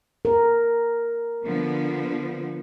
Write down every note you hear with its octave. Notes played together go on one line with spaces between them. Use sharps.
A#4
D3 F3 B3